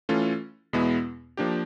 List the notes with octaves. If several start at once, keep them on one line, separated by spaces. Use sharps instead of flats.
E3 A3 C#4 F4 A4
E2 B2 G#3 B3 E4
F3 A#3 D4 G4